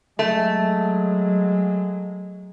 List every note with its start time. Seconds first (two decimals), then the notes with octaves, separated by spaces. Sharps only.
0.19 F#3 G#3 A3